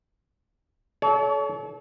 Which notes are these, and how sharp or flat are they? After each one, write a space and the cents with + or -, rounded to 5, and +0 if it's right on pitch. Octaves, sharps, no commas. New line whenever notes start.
A4 -35 C#5 +35